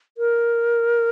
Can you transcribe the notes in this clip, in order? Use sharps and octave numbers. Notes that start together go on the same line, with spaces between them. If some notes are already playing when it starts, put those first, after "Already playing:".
A#4